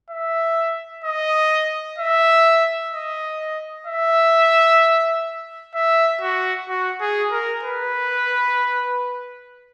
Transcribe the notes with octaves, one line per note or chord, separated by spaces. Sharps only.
E5
D#5
E5
D#5
E5
E5
F#4
F#4
G#4
A#4
B4